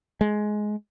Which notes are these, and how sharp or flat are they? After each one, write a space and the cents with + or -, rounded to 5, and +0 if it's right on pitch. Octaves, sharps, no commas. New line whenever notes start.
G#3 +15